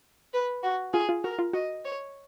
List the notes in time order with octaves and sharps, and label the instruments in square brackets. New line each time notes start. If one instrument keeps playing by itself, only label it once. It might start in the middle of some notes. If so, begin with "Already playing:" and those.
[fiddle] B4
F#4
[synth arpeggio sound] F4 [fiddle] G#4
[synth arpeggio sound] F4
[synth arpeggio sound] F#4 [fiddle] A#4
[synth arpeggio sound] F4
[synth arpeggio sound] F#4 [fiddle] D#5
[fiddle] C#5